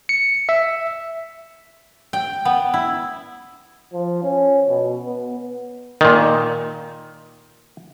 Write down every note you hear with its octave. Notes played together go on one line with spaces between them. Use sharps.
C#7
E5
G5
B3
E4
F3
C#4
B2
B3
A#2 D#3